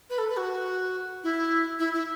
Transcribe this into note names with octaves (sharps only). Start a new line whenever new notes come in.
B4
A4
B4
F#4
E4
E4
E4